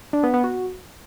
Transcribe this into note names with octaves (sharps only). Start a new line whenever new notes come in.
D4
B3
B3
F#4